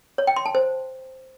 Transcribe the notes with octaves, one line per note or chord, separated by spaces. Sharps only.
C#5
G5
C6
A5
C5